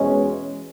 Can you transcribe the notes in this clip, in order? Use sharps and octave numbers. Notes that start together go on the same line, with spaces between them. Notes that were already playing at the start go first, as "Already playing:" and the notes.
Already playing: E2 B2 G#3 C#4